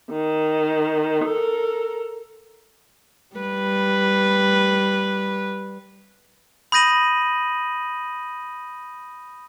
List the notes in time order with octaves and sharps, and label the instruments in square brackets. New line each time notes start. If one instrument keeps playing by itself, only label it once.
[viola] D#3
A4 A#4
[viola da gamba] G3 B4
[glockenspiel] B5 D#6 G6 A#6 D#7 F#7